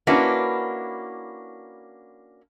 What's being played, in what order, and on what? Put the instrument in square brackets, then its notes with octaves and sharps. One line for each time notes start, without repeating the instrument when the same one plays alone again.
[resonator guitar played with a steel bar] A#3 C#4 D4 E4 F#4 B4